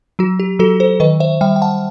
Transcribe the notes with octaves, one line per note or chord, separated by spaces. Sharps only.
F#3 F#4
G4
F#3 F#4 A4
A4 C5
D#3 B4 D#5
C5 E5
G3 E5 G5
G5
F#5 A5